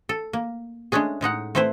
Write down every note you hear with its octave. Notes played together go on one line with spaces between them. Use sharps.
A4
A#3
G#3 A3 C#4 D4 G#4
A2 G#3 D#4 F#5
A3 C4 E4 B4 C5